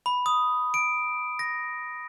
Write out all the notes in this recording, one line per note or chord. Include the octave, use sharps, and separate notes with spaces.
B5
D#6
D7
A#6